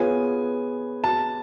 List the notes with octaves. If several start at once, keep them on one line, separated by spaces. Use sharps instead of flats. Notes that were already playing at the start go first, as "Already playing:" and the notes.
Already playing: B3 F4 G#4 C#5 G#5
A5